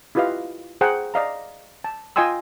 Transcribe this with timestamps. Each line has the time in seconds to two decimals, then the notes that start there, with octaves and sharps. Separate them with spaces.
0.15 E4 F4 G4 B4 D#5 F5
0.81 G#4 C5 F#5 G5 A#5
1.14 D5 D#5 F5 A#5
1.84 A5
2.16 F4 D#5 G5 G#5 C6 E6